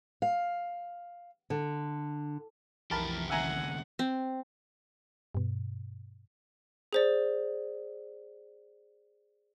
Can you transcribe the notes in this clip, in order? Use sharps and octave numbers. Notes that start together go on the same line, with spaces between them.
F5
D3
B1 F2 E3 G4 A#4 A5 B5
D#2 C#3 E5 F#5 G#5 A#5
C4
G2 B2
G#4 C5 D5